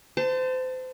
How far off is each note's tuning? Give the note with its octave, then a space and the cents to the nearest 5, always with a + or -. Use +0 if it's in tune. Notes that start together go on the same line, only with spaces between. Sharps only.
C5 -30 A5 +20